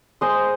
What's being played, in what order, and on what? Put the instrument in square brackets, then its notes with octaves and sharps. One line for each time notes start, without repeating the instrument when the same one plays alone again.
[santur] G#3 C5 D#5